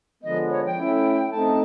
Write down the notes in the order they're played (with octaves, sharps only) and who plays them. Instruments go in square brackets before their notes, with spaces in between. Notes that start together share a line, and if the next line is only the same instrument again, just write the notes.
[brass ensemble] D3 F3 G#3 B3 [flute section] D#5
[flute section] C#5
G5
[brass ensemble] A3 C#4 E4
[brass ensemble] A3 C4 D#4 [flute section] A5